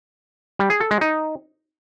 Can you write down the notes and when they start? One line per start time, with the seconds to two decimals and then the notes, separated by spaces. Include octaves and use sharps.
0.59 G3
0.70 G#4
0.80 A4
0.91 G#3
1.01 D#4